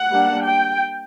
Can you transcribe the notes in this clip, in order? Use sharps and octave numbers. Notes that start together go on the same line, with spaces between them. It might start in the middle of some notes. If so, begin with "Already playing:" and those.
Already playing: F#5
G3 A#3 D4
G5